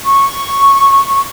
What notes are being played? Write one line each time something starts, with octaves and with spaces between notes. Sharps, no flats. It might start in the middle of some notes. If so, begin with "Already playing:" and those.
C#6